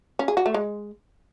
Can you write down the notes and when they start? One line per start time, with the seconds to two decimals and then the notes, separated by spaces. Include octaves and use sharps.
0.19 C#4
0.28 G#4
0.37 F#4
0.46 A3
0.54 G#3